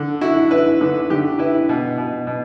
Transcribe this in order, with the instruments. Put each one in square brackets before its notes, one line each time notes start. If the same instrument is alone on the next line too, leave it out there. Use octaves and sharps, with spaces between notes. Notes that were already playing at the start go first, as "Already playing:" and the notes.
Already playing: [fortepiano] D3
E4 F#4
E4 B4
D3 B4
D3 G4
E4 B4
B2
B2
B2